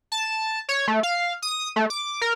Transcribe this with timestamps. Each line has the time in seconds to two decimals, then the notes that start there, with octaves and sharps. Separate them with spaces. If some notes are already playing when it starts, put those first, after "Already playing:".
0.12 A5
0.69 C#5
0.88 A3
1.03 F5
1.42 D#6
1.76 A3
1.90 D6
2.22 A#4